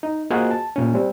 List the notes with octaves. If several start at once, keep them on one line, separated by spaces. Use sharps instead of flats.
D#4
A#3 F4 F#4 G#4 C5 D#5
A5
A#2 C#4
G3 C4